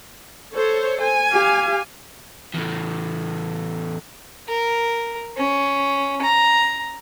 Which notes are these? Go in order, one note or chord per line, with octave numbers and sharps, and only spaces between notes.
A4 C5 C#5
G#5
G4 F5
E2 A2
A#4
C#4
A#5